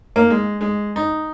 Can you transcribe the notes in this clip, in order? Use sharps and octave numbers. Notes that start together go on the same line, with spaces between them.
A#3
G#3
G#3
D#4